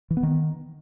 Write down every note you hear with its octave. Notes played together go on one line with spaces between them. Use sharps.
E3
B3
D#3